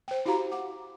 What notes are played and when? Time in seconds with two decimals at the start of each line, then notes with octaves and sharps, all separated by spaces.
0.08 C5 G5
0.26 E4 F#4 G4 F5 A#5
0.52 F#5 D6